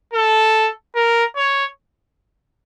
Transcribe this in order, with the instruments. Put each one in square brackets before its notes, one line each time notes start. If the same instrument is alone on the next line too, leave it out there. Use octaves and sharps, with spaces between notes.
[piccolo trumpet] A4
A#4
C#5